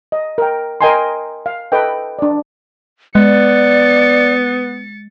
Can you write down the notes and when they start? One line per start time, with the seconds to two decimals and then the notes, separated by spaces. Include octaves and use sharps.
0.12 D#5
0.38 A#4 G5
0.81 A#4 D#5 G5 G#5 A#5 C6
1.46 F5
1.72 A4 B4 D#5 G5
2.19 D4 D5
3.15 G#3 B3 D5 A6 C#7